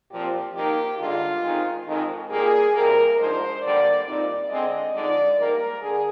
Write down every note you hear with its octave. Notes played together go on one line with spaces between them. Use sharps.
A#2 F3 C4 G4
D#3 A#3 D#4 G4
G2 D3 G#3 F4
D#3 G#3 C4 D#4
F2 D#3 G#3
A#2 G3 A#3 G#4
F2 C3 G3 A#3 A#4
G#2 F3 G#3 D4 C5
D3 G3 A#3 D5
A#2 G3 C4 D#4 D5
D3 G#3 C4 D#5
D3 F3 G#3 D#4 D5
G#2 G3 A#3 A#4
D3 G#4